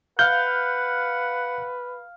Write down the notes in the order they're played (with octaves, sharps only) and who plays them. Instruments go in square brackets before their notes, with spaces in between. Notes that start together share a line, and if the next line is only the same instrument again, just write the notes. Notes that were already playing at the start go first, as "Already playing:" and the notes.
[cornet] B4 [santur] F5 [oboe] F#5 [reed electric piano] G6